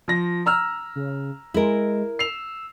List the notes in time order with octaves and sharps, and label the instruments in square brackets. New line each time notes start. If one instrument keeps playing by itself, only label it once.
[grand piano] F3 A#6
A#5 E6 F6
[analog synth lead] C#3
[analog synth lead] G#3 [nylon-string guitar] E4 A#4
[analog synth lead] E6 [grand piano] C7 F7